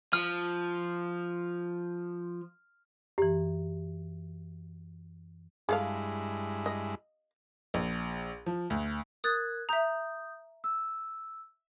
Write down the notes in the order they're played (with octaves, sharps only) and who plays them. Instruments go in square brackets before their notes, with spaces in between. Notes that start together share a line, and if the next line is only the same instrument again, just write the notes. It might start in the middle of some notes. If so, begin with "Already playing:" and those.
[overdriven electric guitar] F3 [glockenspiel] F6
[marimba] F#2 E3 [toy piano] G4
[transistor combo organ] G2 G#3 E4 [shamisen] G#4 A4 F5
[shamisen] D#5
[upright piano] A#1
F3
D2
[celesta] A#4 F#6 G#6 [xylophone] D#6 A6
[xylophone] E5 A#5 [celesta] D#6 G6
[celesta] E6